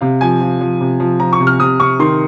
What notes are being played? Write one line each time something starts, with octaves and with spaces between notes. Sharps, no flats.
C3 F5
F3 G#5
F3
F3
C3
F3
F3 A#5
C#6
C3
F6
C3 D#6
C3 C#6
D#3 C6